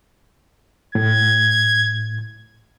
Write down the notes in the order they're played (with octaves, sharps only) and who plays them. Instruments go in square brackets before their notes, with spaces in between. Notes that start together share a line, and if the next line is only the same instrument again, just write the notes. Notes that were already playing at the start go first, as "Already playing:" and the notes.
[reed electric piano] A2 [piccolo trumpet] G#6